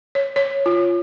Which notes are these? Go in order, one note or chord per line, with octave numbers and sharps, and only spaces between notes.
C#5
C#5
F4